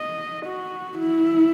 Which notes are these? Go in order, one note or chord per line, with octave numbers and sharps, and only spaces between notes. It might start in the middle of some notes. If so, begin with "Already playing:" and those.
Already playing: D#5
F#4
E4